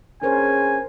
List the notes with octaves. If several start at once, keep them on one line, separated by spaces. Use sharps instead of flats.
C#4 D4 G#4 A#4 C5 G#5